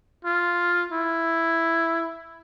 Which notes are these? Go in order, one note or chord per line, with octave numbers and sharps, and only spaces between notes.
F4
E4